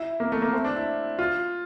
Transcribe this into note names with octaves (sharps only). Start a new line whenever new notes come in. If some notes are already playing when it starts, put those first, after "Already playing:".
Already playing: E4
A#3
A3
A#3
C4
D4
E4
F4